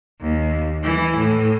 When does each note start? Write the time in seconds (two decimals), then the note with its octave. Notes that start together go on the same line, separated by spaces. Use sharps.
0.21 D#2
0.84 E3
1.17 A2